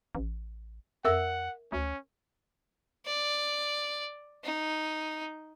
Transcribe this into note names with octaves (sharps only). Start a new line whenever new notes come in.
A1
F2 A#4 E5 F#5 E6
D2 C#4
D5
D#4